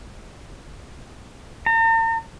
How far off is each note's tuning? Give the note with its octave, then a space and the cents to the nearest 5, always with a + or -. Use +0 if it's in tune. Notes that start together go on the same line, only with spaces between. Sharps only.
A#5 -45